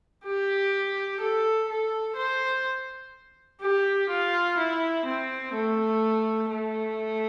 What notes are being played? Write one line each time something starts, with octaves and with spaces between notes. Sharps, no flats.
G4
A4
A4
C5
G4
F4
E4
C4
A3
A3